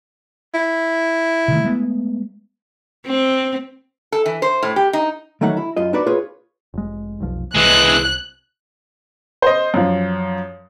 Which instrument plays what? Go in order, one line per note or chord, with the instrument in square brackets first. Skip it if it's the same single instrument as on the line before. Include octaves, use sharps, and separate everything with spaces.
[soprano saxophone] E4
[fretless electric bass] C3 D#3 A3
G#3 A3 B3
[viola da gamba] C4
[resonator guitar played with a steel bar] A4
E3
C5
A2
G4
D#4
[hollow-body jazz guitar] D#3 E3 F#3 A3 D#4 F#5
E4
F#2 F4 D#5
D4 D#4 F#4 B4 D5
F4 G#4 B4 C#5
[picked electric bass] F1 G#3
F1 B1 F3
[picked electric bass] C2 [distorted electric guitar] E3 G#3 [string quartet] F#6
[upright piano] C5 D#5
F#2 F3